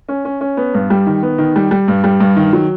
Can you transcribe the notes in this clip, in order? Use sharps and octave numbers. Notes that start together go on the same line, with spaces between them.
C#4
C#4
C#4
B3
G2
G3
D#3
B3
D#3
G3
G3
G2
G3
G2
D#3
F#3